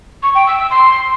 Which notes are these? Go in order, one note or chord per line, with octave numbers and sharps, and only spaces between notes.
C#6
G5
E6
E6
C6